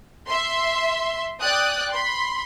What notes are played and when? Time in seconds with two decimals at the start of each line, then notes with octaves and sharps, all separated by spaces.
0.28 E5 C6
1.41 D5 G5 D#6 F#6
1.93 B5 C6